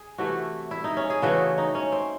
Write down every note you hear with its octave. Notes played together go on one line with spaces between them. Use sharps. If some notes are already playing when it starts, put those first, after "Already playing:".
Already playing: G#4
C3 E3 A3 F#4
E4
D#4
C#4
G#4
C#3 E3 A3 F#4
D#4
C#4
C4